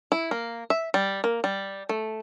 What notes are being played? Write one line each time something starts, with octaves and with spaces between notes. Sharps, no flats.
E4
A#3
E5
G3
A#3
G3
A3